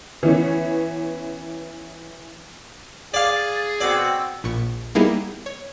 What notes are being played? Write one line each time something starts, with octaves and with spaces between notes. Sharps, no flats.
E3 B3 C#4
G#4 D5 F5 A6
B2 C4 F#4 D5 E6
A#1 A#2 C#6
G3 A#3 B3 D#4 E4 G#4
C#5